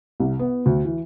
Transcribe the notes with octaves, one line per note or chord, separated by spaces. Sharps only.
C2
B3
D2
E3